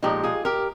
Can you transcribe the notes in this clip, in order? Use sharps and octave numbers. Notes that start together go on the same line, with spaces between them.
A#2 F3 G#3 D#4 G4
F4 G#4
G4 A#4